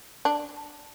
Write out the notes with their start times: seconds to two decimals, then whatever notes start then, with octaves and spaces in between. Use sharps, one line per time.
0.25 D4